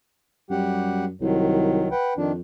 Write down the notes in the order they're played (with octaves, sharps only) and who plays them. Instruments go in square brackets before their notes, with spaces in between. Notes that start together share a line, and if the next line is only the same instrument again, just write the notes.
[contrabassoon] F#2 [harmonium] G3 G4 F#5
[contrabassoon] C2 [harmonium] D#3 F#3
[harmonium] B4 F#5 G5
[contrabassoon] F2 [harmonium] D#3 D4